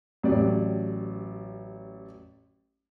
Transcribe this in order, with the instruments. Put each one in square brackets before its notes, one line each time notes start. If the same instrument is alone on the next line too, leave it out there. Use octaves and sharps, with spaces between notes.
[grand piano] A1 F#3 G4 D5